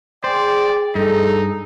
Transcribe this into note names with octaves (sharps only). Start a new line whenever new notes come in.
G#4 C5 D5 G5
G2 D#4 A4